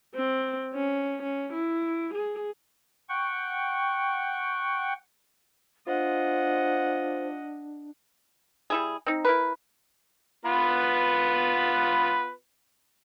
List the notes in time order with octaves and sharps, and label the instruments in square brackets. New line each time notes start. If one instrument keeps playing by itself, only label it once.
[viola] C4
C#4
C#4
E4
G#4
[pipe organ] F#5 G5 C#6
[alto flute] D4 [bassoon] F4 [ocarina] C5 [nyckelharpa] D#5 F#5
[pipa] G3 E4 G#4
C4 D#4
E4 A#4 B4
[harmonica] B3 F4 B4